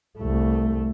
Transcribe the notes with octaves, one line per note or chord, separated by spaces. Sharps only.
C2 A3